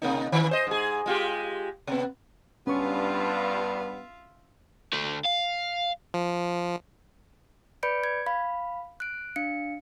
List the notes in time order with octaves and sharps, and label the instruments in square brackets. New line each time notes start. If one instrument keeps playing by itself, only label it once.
[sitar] C3 A#3 D#4
D#3 E3
C5 D#5
G#2 G#4
G#3 F4 G4
C3 B3
[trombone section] G2 [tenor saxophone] B3 [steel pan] C#4 C#6 [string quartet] F4 E5 F5
[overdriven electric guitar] D3 A3
F5
[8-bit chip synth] F3
[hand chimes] B4 D5 B5 G6 C#7 D7
G#6
F5 B5
F#6 D7
D4 F5 C#7